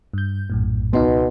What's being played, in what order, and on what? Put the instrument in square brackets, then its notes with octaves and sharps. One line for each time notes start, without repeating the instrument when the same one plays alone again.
[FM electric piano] G2 G6
A#1 F#2 A2
[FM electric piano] C#2 D#4 C6 [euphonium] B2 [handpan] B3